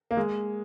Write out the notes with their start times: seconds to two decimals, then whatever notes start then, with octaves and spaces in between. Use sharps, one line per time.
0.11 A#3
0.17 G#3